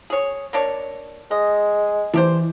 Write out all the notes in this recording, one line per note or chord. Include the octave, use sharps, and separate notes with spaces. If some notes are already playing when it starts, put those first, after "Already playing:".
G#4 C#5
A#3 D4 C#5
G#3 D#5
E3 D4 G4 C5